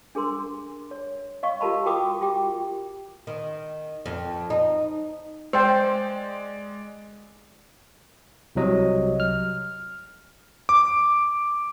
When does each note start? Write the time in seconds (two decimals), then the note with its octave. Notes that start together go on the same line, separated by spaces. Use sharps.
0.15 D4 G#4 A#4 C6
0.91 C#5
1.43 D#5 F5 C#6
1.61 F4 G4 A#4 A5 B5
1.86 F#4 A#4 G5 B5 D6 D#6
2.21 F4 G4 G5 D6
3.27 D#3
4.06 F2
4.50 D#4
5.53 G#3 C5 D5 G5
8.55 C2 C3 F#3 D#5
9.20 F6
10.69 D6